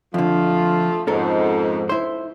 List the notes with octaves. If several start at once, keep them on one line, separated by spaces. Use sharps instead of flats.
F2 D3 F3 A3 F4
F2 G#2 C#4 A4 A#4
E4 C5